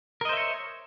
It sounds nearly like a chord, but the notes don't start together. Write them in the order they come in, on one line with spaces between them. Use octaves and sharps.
A#4 D#5 C5 E5 C#5